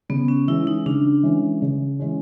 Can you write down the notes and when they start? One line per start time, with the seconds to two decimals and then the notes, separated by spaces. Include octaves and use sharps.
0.09 C#3 B3
0.28 C#4
0.48 E3 G#3 C#4 E4
0.67 D#4
0.86 C#3 D4
1.23 E3 G#3 C#4
1.62 C#3
1.99 E3 G#3 C#4